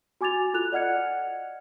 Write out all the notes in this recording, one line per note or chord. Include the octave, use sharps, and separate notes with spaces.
F#4 G#5 D6 G#6 A6 F7
F4 A4 F#6 F7
D5 D#5 F#5 F6 G#6 C#7